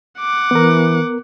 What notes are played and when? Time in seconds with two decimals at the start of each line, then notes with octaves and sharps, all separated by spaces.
0.20 F#5 D6
0.51 E3 B3 A#4